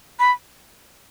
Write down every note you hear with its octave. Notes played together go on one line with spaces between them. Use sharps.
B5